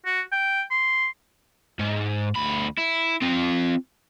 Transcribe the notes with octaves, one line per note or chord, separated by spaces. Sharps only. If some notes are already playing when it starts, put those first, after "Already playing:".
F#4
G5
C6
G#2
D2 B5
E4
C4 F4